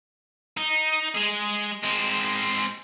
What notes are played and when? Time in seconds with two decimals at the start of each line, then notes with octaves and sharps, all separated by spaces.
0.57 D#4
1.15 G#3 G#4
1.83 G#3 C4